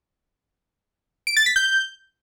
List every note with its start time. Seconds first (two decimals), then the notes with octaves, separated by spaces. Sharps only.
1.27 D7
1.37 A6
1.46 B6
1.56 G6